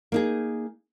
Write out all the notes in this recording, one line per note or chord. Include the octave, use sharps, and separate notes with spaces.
A#3 D#4 G#4